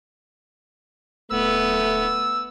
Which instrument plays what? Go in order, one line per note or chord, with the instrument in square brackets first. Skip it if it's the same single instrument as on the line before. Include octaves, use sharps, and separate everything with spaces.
[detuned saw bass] D1 [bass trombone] A3 [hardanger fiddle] B3 [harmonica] E6